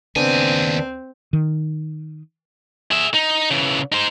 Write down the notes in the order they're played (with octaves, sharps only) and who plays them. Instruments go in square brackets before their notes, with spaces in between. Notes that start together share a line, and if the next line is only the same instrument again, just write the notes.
[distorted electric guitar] D#2 G#5 [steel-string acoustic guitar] C#3 B3 D4 [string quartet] C4
[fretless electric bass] D#3
[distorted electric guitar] G#4 E5
D#4
C#3 E3
D#4 C5